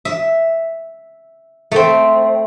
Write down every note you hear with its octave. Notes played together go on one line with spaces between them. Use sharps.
E5
A3 C4